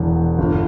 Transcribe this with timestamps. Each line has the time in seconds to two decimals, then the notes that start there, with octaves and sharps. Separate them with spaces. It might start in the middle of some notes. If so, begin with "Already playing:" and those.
Already playing: E1 E2
0.38 G1